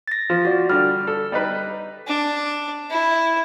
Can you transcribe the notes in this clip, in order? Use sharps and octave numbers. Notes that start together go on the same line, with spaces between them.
A6 A#6
F3
F#4 D5
D3 G3 F6
A4
G3 D#4 B4
D4
E4